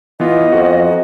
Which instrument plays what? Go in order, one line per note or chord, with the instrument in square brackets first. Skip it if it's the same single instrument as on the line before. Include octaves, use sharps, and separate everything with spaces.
[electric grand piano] E3 B3 F4 [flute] D#5
[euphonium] F2 [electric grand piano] F#4